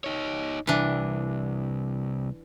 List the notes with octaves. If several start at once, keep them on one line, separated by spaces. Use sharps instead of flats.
D#4 C#5
C2 E3 D4